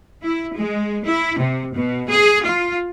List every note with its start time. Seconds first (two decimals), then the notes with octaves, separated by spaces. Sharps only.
0.24 E4
0.56 G#3
1.06 E4
1.39 C3
1.74 B2
2.10 G#4
2.45 F4